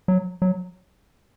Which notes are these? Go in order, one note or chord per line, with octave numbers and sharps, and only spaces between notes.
F#3
F#3